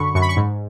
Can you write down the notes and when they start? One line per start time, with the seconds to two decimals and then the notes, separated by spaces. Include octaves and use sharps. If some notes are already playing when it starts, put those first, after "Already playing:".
Already playing: F#2 D3 B5 C#6
0.15 F#2 C#6
0.22 B5
0.29 C#6
0.37 G#2